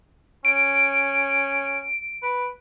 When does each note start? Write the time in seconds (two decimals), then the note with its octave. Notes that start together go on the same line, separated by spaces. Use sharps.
0.45 C#4 D7
2.23 B4